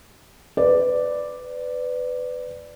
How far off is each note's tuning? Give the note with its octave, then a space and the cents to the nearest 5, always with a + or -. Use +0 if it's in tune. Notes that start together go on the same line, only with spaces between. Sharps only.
B4 +20 D5 +0